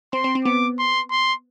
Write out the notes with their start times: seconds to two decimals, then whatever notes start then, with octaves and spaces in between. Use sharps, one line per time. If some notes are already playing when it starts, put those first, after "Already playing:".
0.13 C4 C6
0.24 C4
0.35 C4
0.45 B3 D6
0.78 C6
1.11 C6